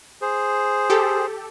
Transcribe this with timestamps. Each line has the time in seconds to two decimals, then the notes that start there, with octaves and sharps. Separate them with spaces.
0.22 G#4 C5
0.90 G4 A4